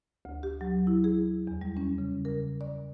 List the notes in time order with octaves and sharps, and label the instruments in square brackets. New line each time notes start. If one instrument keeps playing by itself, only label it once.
[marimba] D2
G4
F#3
E4
G#4
E2
G3
C#4
C#3
A#4
D5